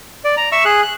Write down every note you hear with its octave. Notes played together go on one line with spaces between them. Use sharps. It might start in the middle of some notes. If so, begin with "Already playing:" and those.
D5
A#5
E5 C#6 E6
G#4 F#6
F#6